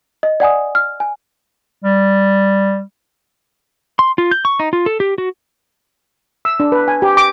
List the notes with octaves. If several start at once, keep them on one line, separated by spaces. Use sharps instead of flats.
D#5
D5 F#5 G#5 D#6
F6
G#5
G3
C6
F4
G6
C#6
D#4
F4
A4
G4
F#4
E6
D4
B4
G#5
G4
D6